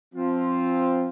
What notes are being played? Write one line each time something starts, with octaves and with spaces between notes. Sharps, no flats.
F3 C4 F4